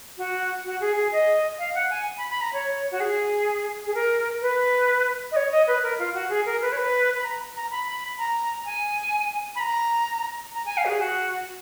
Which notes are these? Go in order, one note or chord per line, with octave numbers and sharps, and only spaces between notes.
F#4
F#4
G#4
G#4
D#5
F5
F#5
G#5
B5
B5
A#5
C#5
F#4
G#4
G#4
A#4
B4
D#5
C#5
D#5
B4
A#4
F4
F#4
G#4
A#4
B4
C#5
B4
B5
A#5
A#5
B5
A#5
G#5
B5
A#5
A#5
G#5
F5
F#4
G#4
F#4